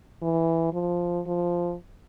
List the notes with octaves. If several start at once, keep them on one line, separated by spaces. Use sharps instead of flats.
E3
F3
F3